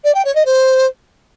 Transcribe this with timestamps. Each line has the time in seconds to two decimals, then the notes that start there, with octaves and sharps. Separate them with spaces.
0.04 D5
0.15 G5
0.25 C#5
0.35 D#5
0.46 C5